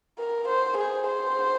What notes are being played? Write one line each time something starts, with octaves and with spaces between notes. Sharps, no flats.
A#4
C5
G#4
C5